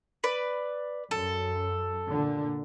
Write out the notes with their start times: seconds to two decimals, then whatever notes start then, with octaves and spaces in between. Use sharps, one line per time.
0.24 B4 D5
1.11 F#2 A4
2.08 A#2 D3